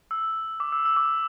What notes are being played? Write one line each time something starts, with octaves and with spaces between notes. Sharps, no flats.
E6
D6
E6
E6
D6